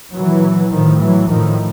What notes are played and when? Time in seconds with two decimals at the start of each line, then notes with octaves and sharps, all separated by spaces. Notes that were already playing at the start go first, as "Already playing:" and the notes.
0.15 A#2 E3 F#3
0.73 A2 D#3 F3
1.02 E3 F#3
1.30 A2 D#3 F3